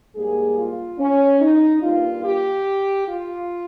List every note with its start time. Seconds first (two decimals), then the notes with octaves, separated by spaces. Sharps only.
0.15 G#2 G3 A#3 G#4
0.58 F4
0.99 C#4
1.41 D#4
1.82 G2 G3 A#3 F4
2.24 G4
3.07 F4